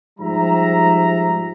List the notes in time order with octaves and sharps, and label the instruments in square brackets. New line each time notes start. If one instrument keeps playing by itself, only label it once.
[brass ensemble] G#2 F3 G3 E5 A#5